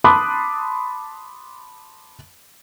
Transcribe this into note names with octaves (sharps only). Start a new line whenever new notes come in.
A5 B5 C6 D6 D#6 F#6